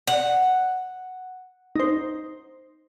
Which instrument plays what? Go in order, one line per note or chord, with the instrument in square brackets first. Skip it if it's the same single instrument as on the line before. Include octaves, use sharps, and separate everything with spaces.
[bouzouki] F#5
[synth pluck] D#4 C5